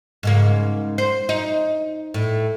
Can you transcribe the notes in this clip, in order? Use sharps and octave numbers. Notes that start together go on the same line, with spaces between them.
G#2 C#3 A#3
C5
D#4
A2